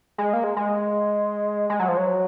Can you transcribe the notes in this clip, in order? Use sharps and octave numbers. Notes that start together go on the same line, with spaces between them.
G#3
A#3
G#3
G#3
G#3
F#3
F3
F#3